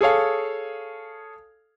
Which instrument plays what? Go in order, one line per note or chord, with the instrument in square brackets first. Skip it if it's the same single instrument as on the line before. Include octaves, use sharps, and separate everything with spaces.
[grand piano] G#4 A4 C#5 F5